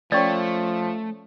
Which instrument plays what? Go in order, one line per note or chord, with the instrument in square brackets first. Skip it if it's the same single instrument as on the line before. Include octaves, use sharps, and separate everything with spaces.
[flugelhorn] F3 [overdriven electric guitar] A3 [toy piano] C#4 D5 [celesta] C#5 C#6 A6